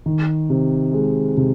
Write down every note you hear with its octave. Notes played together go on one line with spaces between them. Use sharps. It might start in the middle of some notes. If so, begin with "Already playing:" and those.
D#3
C3
G#3
C3